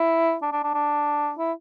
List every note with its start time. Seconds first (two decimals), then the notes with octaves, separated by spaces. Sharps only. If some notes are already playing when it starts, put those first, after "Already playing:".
Already playing: E4
0.42 D4
0.52 D4
0.63 D4
0.74 D4
1.38 E4